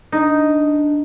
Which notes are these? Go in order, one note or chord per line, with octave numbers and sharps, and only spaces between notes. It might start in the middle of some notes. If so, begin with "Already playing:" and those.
D4 D#4